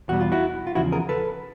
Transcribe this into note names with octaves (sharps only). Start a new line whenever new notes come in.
E2 B2 G3 F#4
F4
E4 F#4
F4
E2 C#3 F3 E4 F#4
G#4 A#4
A4 B4